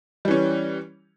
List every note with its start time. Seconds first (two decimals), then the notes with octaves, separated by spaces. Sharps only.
0.25 G3
0.28 E3
0.31 C#4